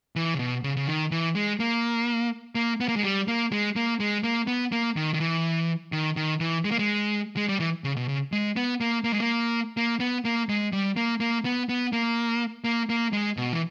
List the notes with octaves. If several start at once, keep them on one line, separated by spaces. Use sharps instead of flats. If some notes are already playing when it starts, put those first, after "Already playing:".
E3
C#3
B2
C#3
C#3
D#3
E3
G#3
A#3
A#3
B3
A#3
G#3
G3
A#3
G#3
A#3
G#3
A#3
B3
A#3
D#3
D#3
E3
D#3
D#3
E3
G#3
A#3
G#3
G#3
G3
E3
C#3
B2
C#3
G#3
B3
A#3
A#3
G#3
A#3
A#3
B3
A#3
G#3
G3
A#3
A#3
B3
B3
A#3
A#3
A#3
G#3
B2
E3